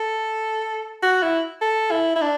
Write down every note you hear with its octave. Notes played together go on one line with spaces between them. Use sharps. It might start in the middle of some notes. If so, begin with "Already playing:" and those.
Already playing: A4
F#4
E4
A4
E4
E4
D4